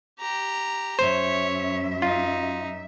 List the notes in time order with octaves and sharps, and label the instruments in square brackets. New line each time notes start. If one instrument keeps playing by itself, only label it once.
[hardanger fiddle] G4 A#5
[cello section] F#2 E5 [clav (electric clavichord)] C5 [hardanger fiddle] C#5
[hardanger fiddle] D#4 [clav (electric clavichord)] F4